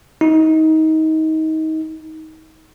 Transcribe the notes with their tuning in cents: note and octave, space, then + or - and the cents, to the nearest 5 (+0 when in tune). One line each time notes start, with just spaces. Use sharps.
D#4 +25